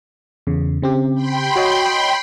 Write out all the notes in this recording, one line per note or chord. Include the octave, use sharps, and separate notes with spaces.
E2 C#3
C#3 C4 G4
G5 B5 C6
F#4 C#5 D#5